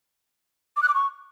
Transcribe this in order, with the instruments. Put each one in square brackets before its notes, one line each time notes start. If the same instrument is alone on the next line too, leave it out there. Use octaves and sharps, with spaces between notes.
[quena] D6
F#6
D6
C#6